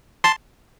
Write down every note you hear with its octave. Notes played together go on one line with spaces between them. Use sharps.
A5 C6